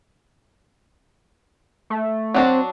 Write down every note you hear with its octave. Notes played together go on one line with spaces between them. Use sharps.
A3
F#3 C4 D4 F#4